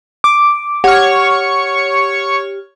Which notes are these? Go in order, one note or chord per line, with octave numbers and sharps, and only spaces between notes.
D6
G4 C#5 F#5 C#6 F6